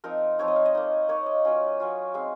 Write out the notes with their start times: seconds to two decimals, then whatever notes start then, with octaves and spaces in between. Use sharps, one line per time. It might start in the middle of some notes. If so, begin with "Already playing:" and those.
0.04 F3 C4 D#4 A#4
0.39 F3 C4 D#4 C#5
0.48 D#5
0.56 F5
0.65 D#5
0.75 A#3 D#4
1.09 A#3 D#4 C#5
1.26 D#5
1.45 F#3 C#4 F4
1.80 F#3 C#4 F4
2.14 G#3 C4 D#4 F5